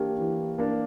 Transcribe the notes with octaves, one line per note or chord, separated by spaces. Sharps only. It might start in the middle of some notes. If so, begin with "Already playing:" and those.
Already playing: E3 A#3 D4 G4 A#4
E3
A#3 D4 A#4